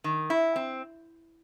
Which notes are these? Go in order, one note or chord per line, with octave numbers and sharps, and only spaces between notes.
D#3
E4
C4